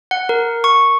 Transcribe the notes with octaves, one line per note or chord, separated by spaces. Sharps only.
F#5
A#4
C#6